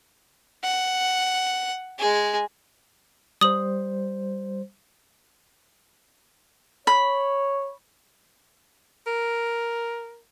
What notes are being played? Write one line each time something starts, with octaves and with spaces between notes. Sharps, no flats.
F#5
G#3 G#4
G3 C5 D#6 F#7
C#5 B5
A#4